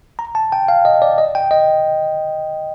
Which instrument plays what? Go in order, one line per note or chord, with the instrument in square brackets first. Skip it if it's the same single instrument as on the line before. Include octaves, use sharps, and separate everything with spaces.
[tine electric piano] A#5
A5
G5
F5
D#5
D5
D#5
G5
D#5